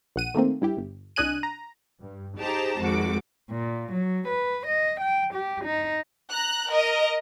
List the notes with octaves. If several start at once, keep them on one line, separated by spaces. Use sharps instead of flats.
A#1 F#5 D#7
D#3 A3 A#3 C4
G2 E4 G4
G1
C2 D4 D#5 G#5 F#6 D#7
A#5
G2
D#4 G4 G#4 C5 A5 A#5
G#1 F2 F#4 D6
A#2
F#3
B4
D#5
G5
G4
D#4
A#5 F#6
A#4 D#5